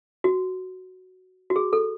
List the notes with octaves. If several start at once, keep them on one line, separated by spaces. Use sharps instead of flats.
F#4
F#4
G#4
A4